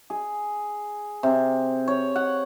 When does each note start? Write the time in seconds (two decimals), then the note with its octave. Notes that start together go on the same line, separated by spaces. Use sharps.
0.10 G#4
1.23 C3
1.88 C#5
2.16 F#5